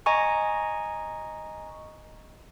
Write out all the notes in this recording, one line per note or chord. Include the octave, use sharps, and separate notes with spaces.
D#5 G#5 A#5 C#6